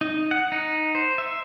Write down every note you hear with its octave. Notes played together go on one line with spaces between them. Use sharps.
D#4
F#5
D#4
C5
E5